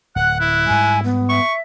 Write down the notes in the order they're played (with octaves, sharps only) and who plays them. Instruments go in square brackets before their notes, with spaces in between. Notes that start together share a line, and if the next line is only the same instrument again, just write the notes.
[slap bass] D1 [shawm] F#5 [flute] F#6
[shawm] E4
[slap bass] G#2 G3 [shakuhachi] G#5
[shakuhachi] B3
[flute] E5 [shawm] C#6